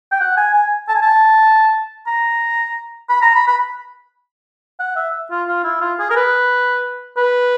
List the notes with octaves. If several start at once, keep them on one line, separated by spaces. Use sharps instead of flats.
G5
F#5
G#5
G#5
A5
G#5
A5
A#5
B5
A#5
B5
B5
F#5
E5
F4
F4
E4
F4
G#4
A#4
B4
B4